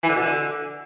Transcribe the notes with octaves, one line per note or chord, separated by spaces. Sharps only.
E3
D3
B2
D3